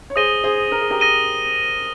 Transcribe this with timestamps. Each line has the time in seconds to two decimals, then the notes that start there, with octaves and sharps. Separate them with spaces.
0.10 C#5
0.16 G#4 C5 D#6 A#6 D#7 G7
0.44 G#4 C5
0.72 A#4
0.81 G#4
0.91 G4 A#4
1.00 D#6 A#6 D#7 G7